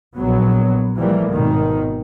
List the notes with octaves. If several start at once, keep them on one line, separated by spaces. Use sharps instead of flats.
A#1 F#3 B3
E3 F3 G3 A3 A#3
G#1 B2 D#3